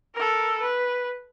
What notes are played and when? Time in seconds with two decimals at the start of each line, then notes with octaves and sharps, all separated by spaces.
0.14 A4 A#4
0.60 B4